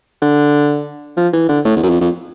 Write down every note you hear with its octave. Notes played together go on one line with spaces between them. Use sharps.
D3
F3
E3
D3
A2
E2
F#2
F2
F2